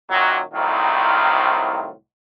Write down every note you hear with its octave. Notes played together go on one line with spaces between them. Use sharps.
F#2 A#2 D#3 F#3
C2 A2 D#3 F#3 C4 F4